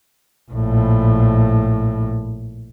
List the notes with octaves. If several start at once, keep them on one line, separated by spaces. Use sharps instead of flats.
A#1 A2